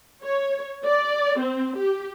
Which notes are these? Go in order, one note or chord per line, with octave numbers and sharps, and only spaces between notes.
C#5
D5
C4
G4